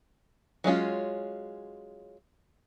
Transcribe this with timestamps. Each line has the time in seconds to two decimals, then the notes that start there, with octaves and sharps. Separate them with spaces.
0.64 F#3 G#3 C#4 F4